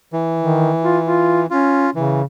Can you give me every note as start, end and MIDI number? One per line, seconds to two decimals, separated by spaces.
0.13 1.46 52
0.38 0.71 51
0.83 0.98 65
1.04 1.42 65
1.50 1.89 61
1.50 1.90 65
1.95 2.24 49
1.95 2.22 52